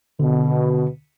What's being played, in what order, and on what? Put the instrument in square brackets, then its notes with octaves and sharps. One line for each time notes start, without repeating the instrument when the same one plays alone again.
[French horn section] B2 [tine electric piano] D3